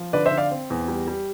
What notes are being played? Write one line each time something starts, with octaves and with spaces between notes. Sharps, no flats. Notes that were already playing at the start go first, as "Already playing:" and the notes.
Already playing: F3
D3 B4 D5
C5 E5
D3
D5 F5
C4
E2
G3
G3